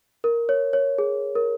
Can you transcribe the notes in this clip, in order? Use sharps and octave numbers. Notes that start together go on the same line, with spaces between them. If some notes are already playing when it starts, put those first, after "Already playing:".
A#4
C#5
C#5
G#4
A#4